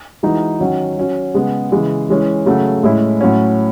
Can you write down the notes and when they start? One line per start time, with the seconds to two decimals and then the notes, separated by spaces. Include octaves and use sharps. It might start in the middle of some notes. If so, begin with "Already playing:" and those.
0.23 E3 G#3 D#4 F#4
0.59 D#3 F#3 C#4 F#4
0.97 F#3 C#4 F#4
1.34 C#3 G#3 B3
1.72 C#3 E3 G#3
2.09 E3 G#3 C#4
2.46 C#3 F#3 A3
2.83 A2 G#3 C#4 E4
3.21 A2 F#3 C#4